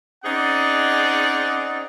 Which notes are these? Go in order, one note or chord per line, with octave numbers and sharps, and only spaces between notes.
C4 C#4 D#4 G#4 D5 F#5